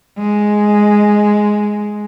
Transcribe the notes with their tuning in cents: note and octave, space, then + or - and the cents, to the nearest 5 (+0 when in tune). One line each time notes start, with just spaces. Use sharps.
G#3 +5